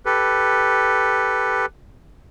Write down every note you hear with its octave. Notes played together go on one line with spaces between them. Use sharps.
G4 A4 B4